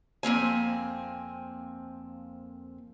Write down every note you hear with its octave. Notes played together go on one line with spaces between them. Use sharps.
F2 A#3 C4 G#5